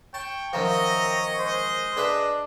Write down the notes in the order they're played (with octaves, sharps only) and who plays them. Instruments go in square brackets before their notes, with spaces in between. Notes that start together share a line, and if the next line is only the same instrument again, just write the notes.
[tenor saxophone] C#5 [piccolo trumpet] G5 [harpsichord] A5
[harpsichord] F#2 D#3 F3 [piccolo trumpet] D#5 [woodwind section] E5 G5 A#5
[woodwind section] G#3 C#4 C5
[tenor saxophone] D4 [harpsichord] G#4 B4 E5